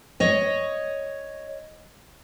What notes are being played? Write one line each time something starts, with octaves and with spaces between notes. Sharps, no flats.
C#5 D#5